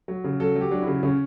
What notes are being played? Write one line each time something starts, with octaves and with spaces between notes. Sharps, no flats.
F#3
C#3
F#3 A4
F#3
G4
F#3 D4
E4
C#3
C#3 C#4